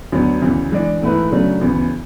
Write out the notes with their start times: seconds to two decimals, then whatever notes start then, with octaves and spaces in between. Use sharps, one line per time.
0.12 D2 D3 F#3 B3
0.42 D2 C#3 E3
0.72 E3 G#3 D4 G#4 D5
1.02 G#2 E3 A3 E4 B4
1.32 F#2 C#3 F#3 A3 D4
1.61 D2 C#3 E3 B3